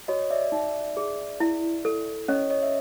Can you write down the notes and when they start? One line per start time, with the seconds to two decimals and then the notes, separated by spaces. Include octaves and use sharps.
0.08 F#4 C#5 D#5
0.30 D5 E5
0.52 D#4
0.97 G#4
1.40 E4
1.85 A4
2.28 C#4 C#5 D#5
2.51 C#5 D#5
2.62 E5